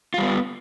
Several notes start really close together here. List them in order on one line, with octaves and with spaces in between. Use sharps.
F4 G3 B3